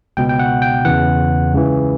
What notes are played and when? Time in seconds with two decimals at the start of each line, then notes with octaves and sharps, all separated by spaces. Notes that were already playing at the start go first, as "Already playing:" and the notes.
0.17 C#2 B2 G5
0.29 G5
0.39 F#5
0.62 G5
0.85 E2 C#3 E3 F#5
1.52 C#2 C#3 E3